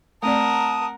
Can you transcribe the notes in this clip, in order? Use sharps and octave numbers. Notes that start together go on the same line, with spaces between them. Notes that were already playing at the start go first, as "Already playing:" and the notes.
A3 C4 A#4 D5 F#5 A5 D#6